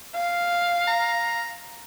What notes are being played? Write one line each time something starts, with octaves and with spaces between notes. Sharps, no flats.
F5
A#5